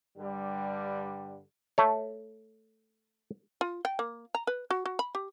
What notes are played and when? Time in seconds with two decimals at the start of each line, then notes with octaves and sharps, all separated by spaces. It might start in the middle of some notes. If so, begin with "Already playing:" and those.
0.18 G2 D3 G3
1.78 A3 C#5
3.61 F4
3.85 G5
3.99 A#3
4.35 A#5
4.47 B4
4.71 F#4
4.85 F#4
4.99 B5
5.15 G4